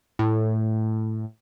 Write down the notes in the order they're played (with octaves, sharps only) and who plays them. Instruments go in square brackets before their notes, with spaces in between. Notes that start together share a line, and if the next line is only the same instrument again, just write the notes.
[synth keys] A2